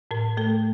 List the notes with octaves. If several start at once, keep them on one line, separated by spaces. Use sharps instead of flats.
A2 A#4
A3 A4